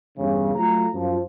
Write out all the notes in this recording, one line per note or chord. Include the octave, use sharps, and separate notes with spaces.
E2 G2 C#3
F#3 A3 F4 A#5
F#2 F3